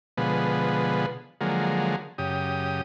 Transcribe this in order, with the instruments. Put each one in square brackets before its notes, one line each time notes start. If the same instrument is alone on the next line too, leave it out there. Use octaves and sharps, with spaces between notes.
[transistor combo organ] B2 D3 F3 G#3 B3
D3 F3 F#3 G#3 A#3
F#2 C#3 G4 D#6